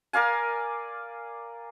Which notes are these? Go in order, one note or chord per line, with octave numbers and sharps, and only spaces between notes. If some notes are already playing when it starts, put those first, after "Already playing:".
A#4 D5 F5 G#5